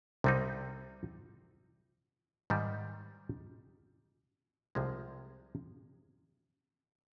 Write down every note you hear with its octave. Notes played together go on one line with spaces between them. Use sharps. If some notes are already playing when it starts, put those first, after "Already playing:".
C2 C3 G3 C4 D#4
G#2 D#3 G3
C2 C3 F3 G#3